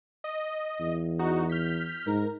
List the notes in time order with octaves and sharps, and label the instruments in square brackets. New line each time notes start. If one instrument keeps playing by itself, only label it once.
[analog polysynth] D#5
[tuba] E2
[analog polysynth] D#4 F#4
F6 G6 B6
[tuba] G#2 [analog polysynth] A#4